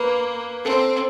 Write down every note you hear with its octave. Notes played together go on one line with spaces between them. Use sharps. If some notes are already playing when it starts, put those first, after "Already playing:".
Already playing: A#3 B4
C4 A4